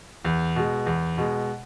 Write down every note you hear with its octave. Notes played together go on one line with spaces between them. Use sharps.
E2
B2 G#3
E2
B2 G#3